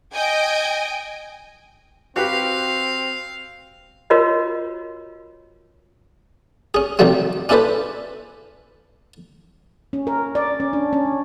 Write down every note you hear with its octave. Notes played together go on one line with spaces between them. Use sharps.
D#5 G5 G#5
C4 F#4 G4 B4 F5
F4 F#4 A#4 C#5 D#5
C#4 G#4
C3 D#3 F#3 G3 A3 C4
C#4 D4 E4 A4 B4 C5
C#4
A#4
D5
C#4
D4
C#4